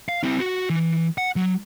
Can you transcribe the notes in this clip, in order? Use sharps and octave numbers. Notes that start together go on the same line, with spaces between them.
F5
C4 E4
F#4
E3
F#5
F#3